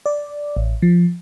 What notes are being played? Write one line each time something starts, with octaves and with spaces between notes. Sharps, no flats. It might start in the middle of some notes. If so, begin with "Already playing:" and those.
D5
A1
F3